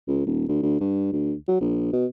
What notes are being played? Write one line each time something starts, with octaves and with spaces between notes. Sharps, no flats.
C#2
D#1
D2
D2
G2
D2
F#3
A#1
B2